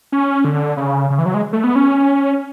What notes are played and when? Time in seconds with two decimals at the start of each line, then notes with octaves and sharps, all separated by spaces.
0.12 C#4
0.45 D3
0.77 C#3
1.10 C#3
1.19 E3
1.26 F#3
1.34 G#3
1.53 A3
1.64 B3
1.76 C#4